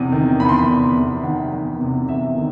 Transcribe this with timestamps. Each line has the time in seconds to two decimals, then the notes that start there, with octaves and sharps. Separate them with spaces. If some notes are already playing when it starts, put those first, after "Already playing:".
Already playing: E2 C3
0.12 D#3
0.40 E2 B5
0.49 C6
0.58 B5
0.68 C3
0.96 E2
1.24 D#3 F#5
1.52 E2
1.81 C3
2.08 E2 E5
2.37 D#3